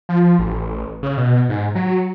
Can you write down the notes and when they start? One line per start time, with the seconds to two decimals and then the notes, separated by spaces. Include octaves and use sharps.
0.09 F3
0.39 A1
1.03 C#3
1.17 B2
1.49 G#2
1.75 F#3